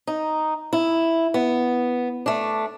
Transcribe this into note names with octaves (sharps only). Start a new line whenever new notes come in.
D#4
E4
B3
A3 D4